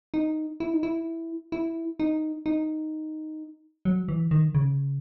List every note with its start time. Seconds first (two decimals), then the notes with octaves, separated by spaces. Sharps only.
0.14 D#4
0.60 E4
0.73 D#4
0.83 E4
1.52 E4
2.00 D#4
2.46 D#4
3.85 F#3
4.08 E3
4.31 D#3
4.55 C#3